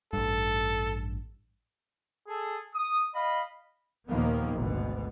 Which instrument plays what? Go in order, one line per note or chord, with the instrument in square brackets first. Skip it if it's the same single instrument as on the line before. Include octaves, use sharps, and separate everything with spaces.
[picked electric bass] A1 G2 [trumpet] A4
[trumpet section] G#4 A4
D#6
D#5 F5 B5
[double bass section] D#2 A#2 D#3 F3 A#3 B3
G#1 D2 B2